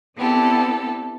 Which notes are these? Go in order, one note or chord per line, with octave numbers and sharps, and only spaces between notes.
B3 C4 D4 E4 G4 A4